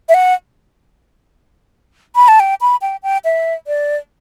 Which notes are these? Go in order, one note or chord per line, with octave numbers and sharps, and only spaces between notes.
E5
F#5
B5
A5
G5
B5
G5
G5
E5
D5